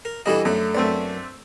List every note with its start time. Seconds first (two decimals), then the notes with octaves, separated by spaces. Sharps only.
0.05 A#4
0.26 E3 G3 D4 F#4 A4 D#5
0.45 F#2 A3 D4
0.74 F#2 A3 B3 C4 D4